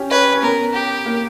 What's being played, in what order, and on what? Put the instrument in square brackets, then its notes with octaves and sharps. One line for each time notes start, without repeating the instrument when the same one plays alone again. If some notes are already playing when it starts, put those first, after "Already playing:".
Already playing: [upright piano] C#4 G4
[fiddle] B4 [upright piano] C#5
[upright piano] C#4
[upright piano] B3 [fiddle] A#4
[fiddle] G4
[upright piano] A#3